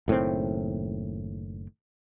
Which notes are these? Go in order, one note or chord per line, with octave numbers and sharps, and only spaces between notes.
F#1 A2 D#3 C4